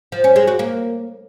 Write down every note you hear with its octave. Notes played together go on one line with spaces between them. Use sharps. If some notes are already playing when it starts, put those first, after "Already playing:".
F3
C#4
G#3
F#4
A#3